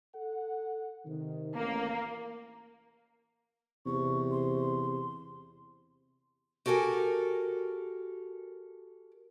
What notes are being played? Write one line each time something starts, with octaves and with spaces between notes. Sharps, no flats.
A4 F#5
C3 D#3
A1 A#3
E2 C3 C#6
C6
F#4 G4 A4 A#4 G#5